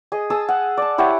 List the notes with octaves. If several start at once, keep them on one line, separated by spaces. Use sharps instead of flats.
G#4 D#5
G#4 A5 D#6 E6
F#5
D5 A5
E4 G4 C#5 F#5